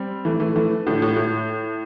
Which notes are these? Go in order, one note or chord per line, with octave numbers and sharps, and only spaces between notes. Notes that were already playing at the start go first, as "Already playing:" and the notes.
Already playing: G3 C4
E3 A3
E3 A3
E3 A3
A2 D3
A2
A2